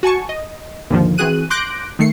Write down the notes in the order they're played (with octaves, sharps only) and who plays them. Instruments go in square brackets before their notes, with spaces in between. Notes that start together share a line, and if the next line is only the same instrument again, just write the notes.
[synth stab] F#4 G#5 A5 C#6
D#5
D#2 G#2 D3 D#3 F3
E3 C4 F#4 G#4 F#6 D#7
C6 D6 F#6 G6 A#6 D7
D#3 A3 C7 C#7